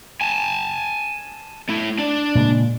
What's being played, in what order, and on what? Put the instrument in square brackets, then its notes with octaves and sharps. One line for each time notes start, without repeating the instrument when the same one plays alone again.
[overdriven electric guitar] G#5 A5
A3 E4
D4 D5
[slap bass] A#2 C#3 G#3